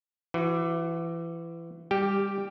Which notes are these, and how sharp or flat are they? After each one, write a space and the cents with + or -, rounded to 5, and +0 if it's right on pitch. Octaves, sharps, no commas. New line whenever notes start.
E3 +25 F#4 +0
G3 +20 G4 +0 G5 +0